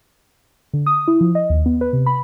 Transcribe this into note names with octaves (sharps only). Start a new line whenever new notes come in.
D3
D#6
E4
F3
D#5
D#2
B3
B4
C3
B5